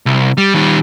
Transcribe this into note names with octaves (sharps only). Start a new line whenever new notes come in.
C2
G3
D#3 G3